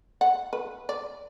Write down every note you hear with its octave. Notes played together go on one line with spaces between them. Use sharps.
F#5
B4
D5